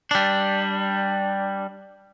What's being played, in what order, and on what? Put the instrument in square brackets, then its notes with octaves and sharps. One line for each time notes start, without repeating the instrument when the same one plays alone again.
[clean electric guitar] G3 D4